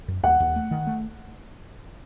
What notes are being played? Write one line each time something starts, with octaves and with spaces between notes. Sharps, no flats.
F#2
D#2 F#5
D#2
A3
D#3
A3